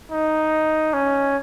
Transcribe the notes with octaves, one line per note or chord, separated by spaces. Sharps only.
D#4
C#4